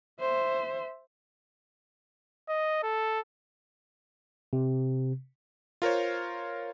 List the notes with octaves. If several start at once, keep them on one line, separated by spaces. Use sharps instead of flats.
C5 E5
D#5
A4
C3
F4 A#4 C5 C#5